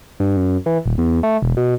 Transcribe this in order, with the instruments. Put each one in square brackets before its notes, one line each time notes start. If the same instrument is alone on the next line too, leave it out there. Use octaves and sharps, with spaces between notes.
[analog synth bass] G2
F#2
E3
D#1
E2
A3
E1
B2